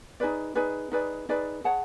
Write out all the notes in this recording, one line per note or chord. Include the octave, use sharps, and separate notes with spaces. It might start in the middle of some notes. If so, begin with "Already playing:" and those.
D#4 G#4 B4 D5
D#4 G#4 B4 D5
D#4 G#4 B4 D5
D#4 G#4 B4 D5
G#4 C#5 F#5 A5